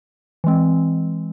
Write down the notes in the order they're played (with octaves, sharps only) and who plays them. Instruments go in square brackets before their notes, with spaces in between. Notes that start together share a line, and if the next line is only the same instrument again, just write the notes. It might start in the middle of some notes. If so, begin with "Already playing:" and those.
[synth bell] E3 G#3 C4